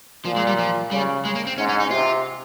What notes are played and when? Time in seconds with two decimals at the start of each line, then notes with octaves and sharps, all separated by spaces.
0.25 A#2 F3
0.36 G#3
0.47 G3
0.59 F3
0.91 C#3 G3
1.25 G#3
1.35 A#3
1.47 C4
1.57 G#2 C#4
1.69 C#4
1.80 D#4
1.91 C3 F4